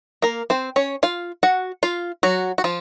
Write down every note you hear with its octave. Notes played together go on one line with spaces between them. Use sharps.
A#3 A#4
C4 C5
C#4 C#5
F4 F5
F#4 F#5
F4 F5
F#3 F#4
F#4
F3 F4